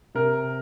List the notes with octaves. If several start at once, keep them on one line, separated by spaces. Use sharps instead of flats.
C3 A#4